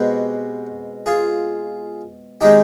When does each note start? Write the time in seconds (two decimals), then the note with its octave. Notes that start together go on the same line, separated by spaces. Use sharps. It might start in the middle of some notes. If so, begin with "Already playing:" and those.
Already playing: B2 G#3 C4 G4 B4
1.06 F4 G#4
2.41 D#3 G#3 C4 D#4 G4